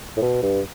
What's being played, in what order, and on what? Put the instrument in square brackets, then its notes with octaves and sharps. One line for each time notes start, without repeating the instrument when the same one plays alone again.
[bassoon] A2
B2
G2